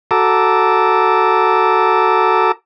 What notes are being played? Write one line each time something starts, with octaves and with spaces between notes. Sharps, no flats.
F#4 A4 A5 A#5 D6 E6